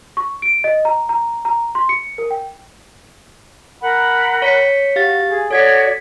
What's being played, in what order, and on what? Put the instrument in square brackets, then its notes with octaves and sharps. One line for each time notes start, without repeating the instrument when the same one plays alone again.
[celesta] C#6
D7
D#5
A#5
A#5
A#5
C6
C#7
A#4
G5
[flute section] A#4 F#5 B5
[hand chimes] C#5 B6 C#7
[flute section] F#4 [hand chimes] G4 F5 A6
[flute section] G#4
[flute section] F#4 C#5 D5 [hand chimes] A4 G#6 B6